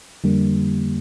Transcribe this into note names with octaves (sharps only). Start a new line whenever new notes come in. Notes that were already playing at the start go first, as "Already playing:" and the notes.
F2 D3 G3 A#3